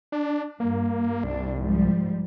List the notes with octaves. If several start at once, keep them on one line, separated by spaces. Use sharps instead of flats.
D4
G2 A#3
C2 D4
G#2 F3 G3